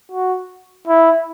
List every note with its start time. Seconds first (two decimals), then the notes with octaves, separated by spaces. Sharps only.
0.12 F#4
0.88 E4